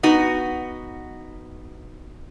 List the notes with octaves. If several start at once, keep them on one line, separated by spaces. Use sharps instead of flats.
B3 D#4 F#4